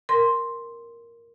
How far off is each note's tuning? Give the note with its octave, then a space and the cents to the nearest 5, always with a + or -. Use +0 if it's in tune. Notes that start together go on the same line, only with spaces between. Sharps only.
A#4 +0 C6 +0